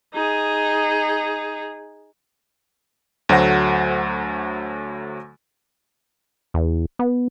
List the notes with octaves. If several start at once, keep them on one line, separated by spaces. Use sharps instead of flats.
D#4 G#4
D2 F#3 A3 C5 F#5 A#6
E2
B3